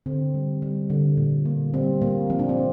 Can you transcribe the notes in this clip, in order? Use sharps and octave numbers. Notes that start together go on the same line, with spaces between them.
D3 C4
G3
G3
D3
A#2
A#3
G3 C4
A#2 A#3
F3 C4
D4
C4
F3